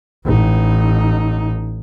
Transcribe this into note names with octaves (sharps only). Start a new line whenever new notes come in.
A1 D#4